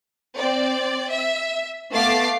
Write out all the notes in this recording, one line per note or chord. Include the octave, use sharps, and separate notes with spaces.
C4 D5
E5
A3 B3 F5 D6 A6 C7